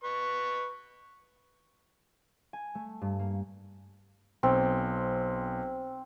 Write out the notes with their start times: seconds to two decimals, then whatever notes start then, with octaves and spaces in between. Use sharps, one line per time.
0.04 B4 C#6
2.53 G#5
2.75 A3
3.02 G2
3.19 A#3
4.43 B1 C4